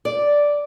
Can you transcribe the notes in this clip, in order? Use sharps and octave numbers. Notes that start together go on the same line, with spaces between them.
D5